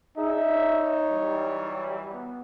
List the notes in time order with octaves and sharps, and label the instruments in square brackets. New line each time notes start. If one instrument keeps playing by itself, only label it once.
[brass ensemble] D4 E5 [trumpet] D#4 [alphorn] G#4
[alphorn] C#5
[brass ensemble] E3 F#3 G3
B3